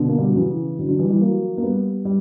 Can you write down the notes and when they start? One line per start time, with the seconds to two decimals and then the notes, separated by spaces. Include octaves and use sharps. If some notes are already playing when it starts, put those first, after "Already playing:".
Already playing: B2 D3
0.09 A#3
0.18 G3
0.27 F#3
0.36 C#3 E3
0.78 D3 F#3
0.88 D3 F#3
0.99 E3 G3
1.10 E3 G3
1.21 F#3 A#3
1.58 A#3
1.62 G3 B3
2.05 G3